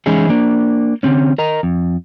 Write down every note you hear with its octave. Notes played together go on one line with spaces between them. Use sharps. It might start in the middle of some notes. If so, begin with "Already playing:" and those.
E3 G#3 C#4 D#4 E4 G#4
A#3 D4
D3 C4 C#4
A#4 D#5 A#5
F2